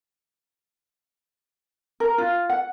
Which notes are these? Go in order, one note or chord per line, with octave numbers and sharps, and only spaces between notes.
A#4
F4
F#5